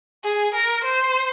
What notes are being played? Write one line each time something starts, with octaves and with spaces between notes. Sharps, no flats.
G#4
A#4
C5